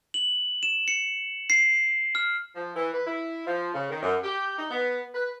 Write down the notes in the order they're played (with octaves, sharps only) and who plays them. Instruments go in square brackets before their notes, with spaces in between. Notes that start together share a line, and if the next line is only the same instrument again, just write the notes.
[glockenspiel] F#7
E7
C#7
C7
F6
[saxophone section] F3
E3
B4
E4
F3
C#3
D#3
F#2
G4
D#4
B3
B4